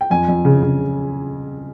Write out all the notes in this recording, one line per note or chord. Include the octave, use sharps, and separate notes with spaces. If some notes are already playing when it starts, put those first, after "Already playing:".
G5
F2 G#5
F2
C#3
C#3